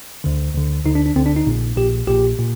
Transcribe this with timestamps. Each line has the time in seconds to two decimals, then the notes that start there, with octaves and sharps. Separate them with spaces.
0.24 D2 D3
0.55 D2 D3
0.85 D2 D3 D#4
0.95 D4
1.06 D4
1.16 D2 D3 C4
1.26 D4
1.36 D#4
1.47 A#1 A#2
1.77 A#1 A#2 G4
2.07 A#1 A#2 G4
2.38 A#2